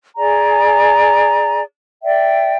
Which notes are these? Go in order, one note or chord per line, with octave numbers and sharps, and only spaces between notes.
G#4 D5 G#5 A#5
D5 E5 G5